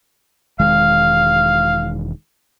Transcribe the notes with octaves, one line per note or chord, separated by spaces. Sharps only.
E1 D#3 G#3 F5